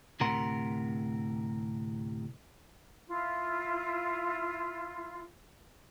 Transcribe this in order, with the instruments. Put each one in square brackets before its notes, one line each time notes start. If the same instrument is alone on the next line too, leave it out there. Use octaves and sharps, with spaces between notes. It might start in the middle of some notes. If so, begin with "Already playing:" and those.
[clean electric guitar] D2 A2 C3 A#4 F#5 C6
[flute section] E4 F4